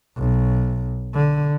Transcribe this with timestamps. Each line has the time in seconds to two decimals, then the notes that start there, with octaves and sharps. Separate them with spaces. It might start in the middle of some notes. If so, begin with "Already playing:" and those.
0.17 B1
1.14 D3